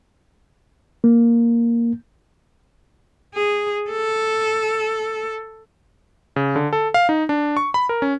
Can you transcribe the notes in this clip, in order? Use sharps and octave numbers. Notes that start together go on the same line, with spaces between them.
A#3
G#4
A4
C#3
D3
A4
F5
D#4
D4
C#6
B5
A#4
C#4